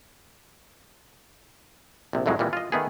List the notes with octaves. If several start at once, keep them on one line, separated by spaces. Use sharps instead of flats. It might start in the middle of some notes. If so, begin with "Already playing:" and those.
A#1 C3
C2 F2 A2 F#3 G#3
A#2 E3 G3 G#3
F4 D#5
D#3 A3 B3 G#4